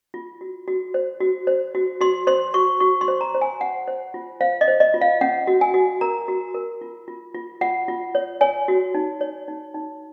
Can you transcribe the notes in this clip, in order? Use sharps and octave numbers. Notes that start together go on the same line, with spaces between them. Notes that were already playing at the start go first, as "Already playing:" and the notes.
F4
F#4
F#4
C5
F#4
C5
F#4
F#4 C6
C5 C6
F#4 C#6
F#4 C#6
C6
C5
A#5
C5
G#5
C5 F#5
C5
F4
C5 F5
D#5
C5
D#5
F4
F5
C#4 F#5
F#4
G#5
F#4
A#4 A#5
F#4
A#4
F4
F4
F4
F4 F#5
F4
C#5
C#5 G#5
F#4
D#4
C#5
D#4
D#4